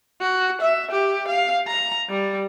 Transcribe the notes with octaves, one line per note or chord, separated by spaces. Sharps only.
F#4
E5
G4
F5
A#5
G3